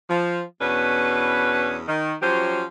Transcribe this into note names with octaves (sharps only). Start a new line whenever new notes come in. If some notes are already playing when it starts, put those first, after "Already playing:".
F3
E2 B2 C#4 D4 B4
D#3
F3 F#3 C#4 F4 G4 C5